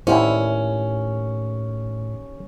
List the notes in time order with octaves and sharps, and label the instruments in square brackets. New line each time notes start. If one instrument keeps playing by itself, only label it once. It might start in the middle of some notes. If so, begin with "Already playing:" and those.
[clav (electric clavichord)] D#2 D5 G#5 [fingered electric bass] A2 [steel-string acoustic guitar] C#4 [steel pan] E4 C5